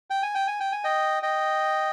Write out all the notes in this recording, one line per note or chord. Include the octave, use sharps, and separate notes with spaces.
G5
G#5
G5
G#5
G5
G#5
D#5 G5
D#5 G5